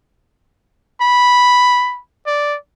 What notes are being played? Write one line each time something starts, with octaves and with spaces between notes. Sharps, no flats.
B5
D5